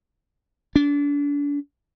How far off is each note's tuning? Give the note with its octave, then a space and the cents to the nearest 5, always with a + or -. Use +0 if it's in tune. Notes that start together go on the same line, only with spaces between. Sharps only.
D4 -35